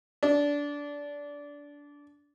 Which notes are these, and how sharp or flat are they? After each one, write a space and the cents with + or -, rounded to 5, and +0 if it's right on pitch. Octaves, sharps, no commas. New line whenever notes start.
D4 -20